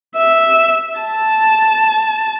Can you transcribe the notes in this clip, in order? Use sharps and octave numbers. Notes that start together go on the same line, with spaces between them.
E5
A5